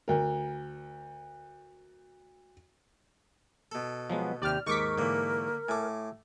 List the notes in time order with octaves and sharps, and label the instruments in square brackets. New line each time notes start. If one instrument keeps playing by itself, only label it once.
[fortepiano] D2 A#4
[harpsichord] B2 A4
[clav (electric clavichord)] F3 F#3 G#3 [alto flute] B3
[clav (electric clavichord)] D#2 C3 [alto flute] G4 [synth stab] D5 F6
[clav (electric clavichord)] D#2 [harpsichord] G#2 [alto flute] A#4 [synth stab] C#6 D6 B6
[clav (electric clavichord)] G#2 E3 [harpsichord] D3 A#3
[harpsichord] A2 D6 [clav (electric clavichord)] A4 G#5